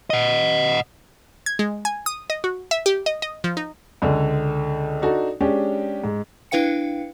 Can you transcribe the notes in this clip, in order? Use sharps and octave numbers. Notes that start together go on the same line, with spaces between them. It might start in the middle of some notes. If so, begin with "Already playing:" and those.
D#5 F#5
G#6
G#3
G#5
D#6
D#5
F#4
E5
G4
D#5
D#5
F3
D#4
C#2 D3
D4 D#4 F#4 A4
G#3 C#4 D4 G4
G#2
D4 E4 B4 F5 G5 C#7